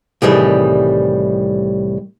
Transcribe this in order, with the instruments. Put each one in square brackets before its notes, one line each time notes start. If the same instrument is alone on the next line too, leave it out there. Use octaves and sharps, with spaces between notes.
[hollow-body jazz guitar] C2 A2 D#3 E3 G3 G#4